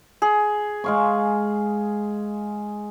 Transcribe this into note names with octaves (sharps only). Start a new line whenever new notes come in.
G#4
G#3 F5 C#6